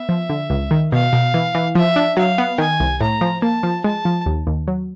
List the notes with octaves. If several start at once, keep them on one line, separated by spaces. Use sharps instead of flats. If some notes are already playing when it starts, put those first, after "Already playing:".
Already playing: B3 E5
F3
D3
C#2
D#3
B2 F5
B2
E3
E3
F3 E5
D4
F#3 F5
B3
D#3 G#5
C2
A2 A#5
F3
A#3 A5
F3
G#3 A5
F3
D#2
D#2
F#3